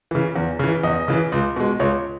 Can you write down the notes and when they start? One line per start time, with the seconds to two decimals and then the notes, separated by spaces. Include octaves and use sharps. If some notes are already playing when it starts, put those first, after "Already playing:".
0.11 C#3 E3
0.36 E2
0.59 C#3 E3
0.83 E2 D#5
1.08 C#3 E3
1.32 C#2
1.56 B2 G#3
1.80 C#2 C#5